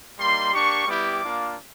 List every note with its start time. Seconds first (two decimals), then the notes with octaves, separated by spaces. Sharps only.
0.19 G3 A#3 D#4 C6
0.53 A#3 D4 G4 C#6
0.87 G3 B3 E4 G4 D6
1.21 A#3 D4 F4